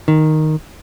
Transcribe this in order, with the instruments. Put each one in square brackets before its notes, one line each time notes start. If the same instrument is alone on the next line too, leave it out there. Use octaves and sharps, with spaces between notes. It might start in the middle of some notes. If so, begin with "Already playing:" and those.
[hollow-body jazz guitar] D#3